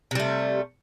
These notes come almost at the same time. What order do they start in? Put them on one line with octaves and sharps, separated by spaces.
C3 G3 A3